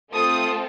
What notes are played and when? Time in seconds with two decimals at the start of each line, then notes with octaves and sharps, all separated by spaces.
0.12 A3 C4 F4 A4 D#6